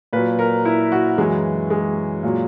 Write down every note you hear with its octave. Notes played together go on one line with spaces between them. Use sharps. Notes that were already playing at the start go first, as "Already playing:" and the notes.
A#2 F#3 B4
A#4
E4
F#4
F#2 E3 G#3
G#3
A#2 F#3